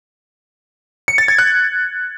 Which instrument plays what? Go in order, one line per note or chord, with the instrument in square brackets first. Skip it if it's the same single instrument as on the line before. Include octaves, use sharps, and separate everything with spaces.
[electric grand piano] C#7
A6
G#6
F#6